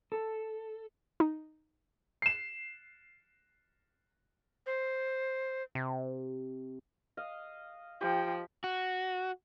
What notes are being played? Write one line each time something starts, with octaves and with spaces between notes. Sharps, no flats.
A4
D#4
C7 E7
C5
C3
D#5 F5
F3 G4 G5
F#4